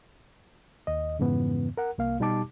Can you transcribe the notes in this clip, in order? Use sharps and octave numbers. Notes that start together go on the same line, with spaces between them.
D#2 D#5
F2 G#2 C#3 E3 B3
A#4 F#5
C2 A#3 F5
B2 G3 D#4 G4 A5 D6